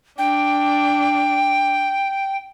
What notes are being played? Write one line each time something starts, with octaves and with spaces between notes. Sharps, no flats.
D4 G5